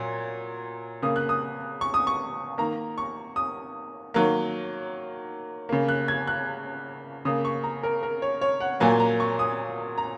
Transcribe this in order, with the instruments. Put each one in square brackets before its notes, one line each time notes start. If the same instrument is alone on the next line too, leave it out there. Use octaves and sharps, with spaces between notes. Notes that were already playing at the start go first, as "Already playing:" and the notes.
Already playing: [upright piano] A#2 F#3
C#3 A#3 D#6
F#6
D#6
C#6
D#6
C#6
D#3 A#3 A#5
C#6
D#6
D#3 F#3 A#3
C#3 A#3
F#6
G#6
F#6
C#3 A#3 D#6
C#6
A#5
A#4
A#4
C#5
C#5
F#5
A#2 F#3 A#3 G#5
A#5
C#6
D#6
A#5